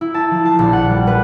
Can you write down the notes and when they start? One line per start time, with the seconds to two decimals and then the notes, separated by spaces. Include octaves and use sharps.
0.01 E4
0.14 A5
0.31 F3
0.45 A5
0.59 A#1
0.73 F#5
0.90 G3
1.07 B4